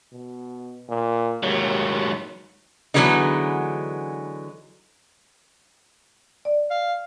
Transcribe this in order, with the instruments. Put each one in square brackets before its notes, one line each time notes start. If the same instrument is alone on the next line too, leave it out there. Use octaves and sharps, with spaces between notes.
[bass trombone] B2
A#2
[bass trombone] D#2 [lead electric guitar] G#2 F#3
[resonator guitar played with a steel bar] D3 E3 F#3 G#3 B3 D#4
[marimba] D5
[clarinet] F5